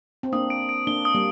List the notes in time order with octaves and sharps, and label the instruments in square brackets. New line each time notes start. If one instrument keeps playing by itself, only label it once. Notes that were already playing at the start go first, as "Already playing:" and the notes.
[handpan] C4
[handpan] A#3 D4 [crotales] D#6
[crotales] D7
D7
[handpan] A#3 D4 [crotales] G7
[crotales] D#6
[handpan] G3 A#3